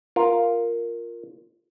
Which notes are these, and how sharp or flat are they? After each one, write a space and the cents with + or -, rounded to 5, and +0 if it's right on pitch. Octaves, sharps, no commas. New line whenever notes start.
F4 +0 A#4 +0